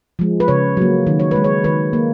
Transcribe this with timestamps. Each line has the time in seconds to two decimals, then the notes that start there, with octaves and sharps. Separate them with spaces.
0.19 F3 G#3
0.40 B4
0.48 C#3 C#5
0.77 F#3 A#3
1.07 D#3
1.20 C#5
1.31 G#3 B4
1.44 C#5
1.64 D#3 B4
1.93 A#3